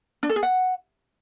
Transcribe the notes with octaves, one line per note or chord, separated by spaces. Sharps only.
D4
A4
G#4
F#5